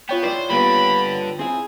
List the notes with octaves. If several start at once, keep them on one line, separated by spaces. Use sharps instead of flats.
B3 F4 C#5 G5
G#3 E4 C5 D5
G2 D3 A#3 B3 B5
C4 E4 G#4